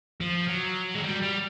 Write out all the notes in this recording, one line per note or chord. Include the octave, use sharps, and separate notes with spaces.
F3
F#3
G#3
G3
G3